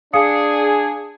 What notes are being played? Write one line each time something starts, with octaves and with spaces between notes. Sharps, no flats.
D4 G#4 F5 D#6 C#7